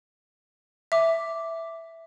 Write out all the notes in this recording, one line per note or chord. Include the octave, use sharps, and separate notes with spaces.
E5 D6